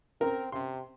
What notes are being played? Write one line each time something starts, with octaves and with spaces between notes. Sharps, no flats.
C4 A#4
C3 C6